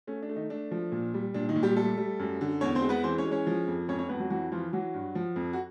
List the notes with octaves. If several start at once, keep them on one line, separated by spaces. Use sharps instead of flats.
A3 C#4
D4
A3
D#3 D#4
A3 D4
F3
A#2
G3
A#2 D4
D#3 D#4
A#2
G3 G4
G3 A3 A4
G3
F#2
D3
E2 C#4 C#5
C4 C5
G#3
B3 B4
E3 C4 C5
C#4 C#5
G#3
C#4 C#5
F3
F2
F2 C#4 C#5
C#4 C#5
F2 B3 B4
F#3 F#4
E3 F#3 F#4
E3 F3 F4
E3 F#3 F#4
G2
F3
F2
F#4